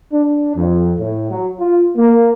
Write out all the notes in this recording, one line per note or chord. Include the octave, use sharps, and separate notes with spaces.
D4
F2
A2
F#3
F4
A#3